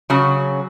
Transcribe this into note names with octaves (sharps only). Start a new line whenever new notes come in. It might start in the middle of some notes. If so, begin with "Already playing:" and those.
C#3 F#3